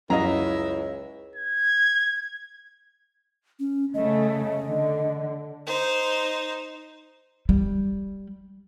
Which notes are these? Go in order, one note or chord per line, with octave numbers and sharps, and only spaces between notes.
C#2 F#2 F#3 E4 D#5 F5 A#5
G#6
C#4
C#3 A3 D#5
D3
D#4 C5
G3